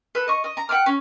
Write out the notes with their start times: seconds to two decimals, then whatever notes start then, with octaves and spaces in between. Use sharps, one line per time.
0.15 A4 B4
0.28 D#5 C#6
0.44 D#5
0.57 A#5
0.69 F#5 G5 E6 F6
0.86 C#4